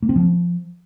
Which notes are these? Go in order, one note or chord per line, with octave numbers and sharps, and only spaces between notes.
A#3
C4
F3